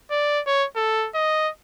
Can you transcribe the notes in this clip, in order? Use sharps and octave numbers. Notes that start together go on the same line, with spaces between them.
D5
C#5
A4
D#5